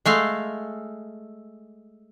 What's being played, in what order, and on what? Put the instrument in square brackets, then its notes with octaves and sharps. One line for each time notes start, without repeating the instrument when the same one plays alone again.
[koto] G#3 A3 F5